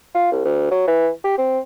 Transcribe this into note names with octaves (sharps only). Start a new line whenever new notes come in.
F4
C2
D2
F#3
E3
G4
C4